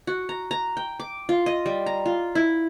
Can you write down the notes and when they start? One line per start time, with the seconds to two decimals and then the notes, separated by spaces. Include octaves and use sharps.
0.07 F#4
0.29 A#5
0.51 A#5
0.77 G5
1.00 D6
1.29 F4
1.46 D#5
1.66 G3
1.86 A#5
2.06 F4
2.35 E4